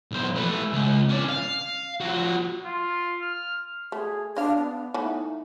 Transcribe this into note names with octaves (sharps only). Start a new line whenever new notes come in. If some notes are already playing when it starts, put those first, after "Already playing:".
B1 C5
A3 B4
C#2
C#4 D5
F5
F3 F#4
F4
F6
A3 G#4
D4 D#5 F5
B3
E3 A3 B3 D#4